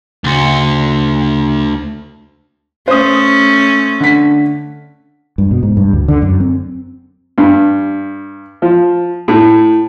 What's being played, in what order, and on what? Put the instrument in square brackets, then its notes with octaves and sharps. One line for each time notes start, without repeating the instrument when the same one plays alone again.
[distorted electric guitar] D2 [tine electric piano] C#3 C6 C#7
[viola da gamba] A3 C#4 [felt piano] C5 D#6
[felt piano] D3 B6
[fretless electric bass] G2
B2
G#2
G2
D2
D3
F#2
C4
[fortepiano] G2
F3
A2